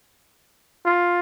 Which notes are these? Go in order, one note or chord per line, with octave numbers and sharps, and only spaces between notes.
F4